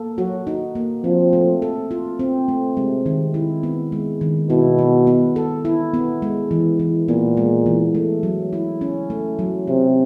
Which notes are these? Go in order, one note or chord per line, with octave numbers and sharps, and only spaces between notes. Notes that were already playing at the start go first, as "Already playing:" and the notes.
Already playing: A#3 A4
F#3 F#4
D#4
A#3
F3 C4
A3
A4
F4
C4
A3
C3 G#3
D#3
E4
B3
G#3
D#3
B2 E4
B3
B3
A4
E4
B3
G#3
E3
E3
A#2 B3
G#3
E3
A3
F#3
E4
C#4
A3
F#3
C3 C4